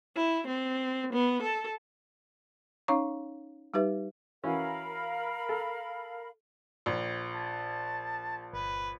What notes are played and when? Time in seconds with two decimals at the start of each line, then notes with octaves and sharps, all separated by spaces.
0.15 E4
0.47 C4
1.13 B3
1.43 A4
2.88 C#4 D#4 C#5 F5 A#5 C#6
3.74 G3 D#4 G4 B4 E5
4.44 E3 C#4 F#4 A#4 F5 B5
5.49 A4
6.86 A#1
7.34 A5
8.53 G1 B4